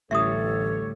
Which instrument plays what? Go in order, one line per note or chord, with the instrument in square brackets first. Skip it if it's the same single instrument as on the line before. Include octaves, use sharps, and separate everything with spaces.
[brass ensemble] A1 [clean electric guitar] D2 A2 G3 [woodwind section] A4 C#5 [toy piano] E5 D#6